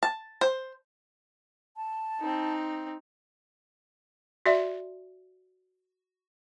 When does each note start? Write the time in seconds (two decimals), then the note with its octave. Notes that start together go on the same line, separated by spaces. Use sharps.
0.03 A5
0.41 C5
1.77 A5
2.20 C4 D#4
4.46 F#4 D5 E5